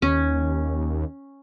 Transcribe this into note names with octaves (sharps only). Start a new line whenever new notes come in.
D#2 C#4